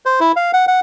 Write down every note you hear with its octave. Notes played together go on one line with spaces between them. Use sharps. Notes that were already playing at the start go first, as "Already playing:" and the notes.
C5
E4
F5
F#5
F#5